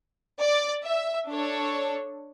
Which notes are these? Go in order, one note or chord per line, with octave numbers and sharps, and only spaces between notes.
D5
E5
D4 A4 C#5